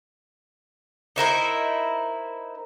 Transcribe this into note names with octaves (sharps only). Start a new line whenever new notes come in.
D#4 E4 A#4 C5